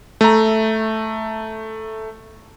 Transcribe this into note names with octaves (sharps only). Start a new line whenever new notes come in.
A3 A#5